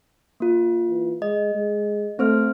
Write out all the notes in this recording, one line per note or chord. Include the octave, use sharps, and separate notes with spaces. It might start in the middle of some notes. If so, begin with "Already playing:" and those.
A#3 F4
E3
G#3 D#5
G#3
A3 C4 C5 F6